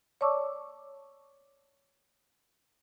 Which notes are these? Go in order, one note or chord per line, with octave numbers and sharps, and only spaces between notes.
C#5 D5 A5 C#6 D6 E6